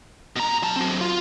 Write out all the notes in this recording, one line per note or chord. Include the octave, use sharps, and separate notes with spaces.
B2 A#5
F#3 A5
F#3 C4
F4